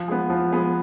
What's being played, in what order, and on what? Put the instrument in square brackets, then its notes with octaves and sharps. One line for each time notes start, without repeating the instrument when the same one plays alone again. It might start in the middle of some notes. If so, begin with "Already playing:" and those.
Already playing: [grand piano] F3
G#3 B3
F3
G#3 B3